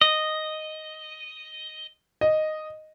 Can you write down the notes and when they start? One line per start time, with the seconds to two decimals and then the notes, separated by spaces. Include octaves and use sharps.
0.01 D#5
2.21 D#5